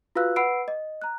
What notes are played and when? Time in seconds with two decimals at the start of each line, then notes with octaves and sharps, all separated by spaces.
0.16 F4 F#4 B4 F5 E6 F#6
0.36 B4 F#5 B5 E6 C7 D7
0.68 D#5
1.02 A#5 F#6